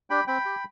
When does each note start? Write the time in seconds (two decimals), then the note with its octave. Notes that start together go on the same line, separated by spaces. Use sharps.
0.10 D4 G4 G5 B5
0.27 C4 G5 B5
0.45 G4